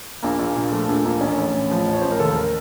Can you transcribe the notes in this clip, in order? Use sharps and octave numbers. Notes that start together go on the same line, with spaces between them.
A#1 A#3
A#1
A#2
F3 A3
A#1 A3
A#1 A#3
A1 C#4
A1
A2
F3
A1
C#5
A1 C5
A#4
D#2 A4
A#4